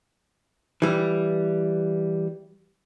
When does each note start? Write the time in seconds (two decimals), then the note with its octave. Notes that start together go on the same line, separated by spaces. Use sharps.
0.82 E3 G3